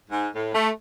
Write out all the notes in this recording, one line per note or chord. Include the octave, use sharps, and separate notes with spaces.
G#2
A2
A3